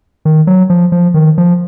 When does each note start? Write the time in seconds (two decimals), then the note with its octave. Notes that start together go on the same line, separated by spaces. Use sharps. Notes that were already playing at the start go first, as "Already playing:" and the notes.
0.25 D#3
0.47 F#3
0.70 F3
0.92 F3
1.14 D#3
1.38 F3